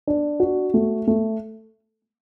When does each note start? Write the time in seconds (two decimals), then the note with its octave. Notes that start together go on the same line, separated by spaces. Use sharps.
0.07 D4
0.40 F#4
0.74 A3
1.07 A3